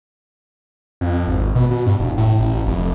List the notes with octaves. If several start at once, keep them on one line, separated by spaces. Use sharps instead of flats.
F2
G#1
B2
B2
G2
E1
A2
A1
F1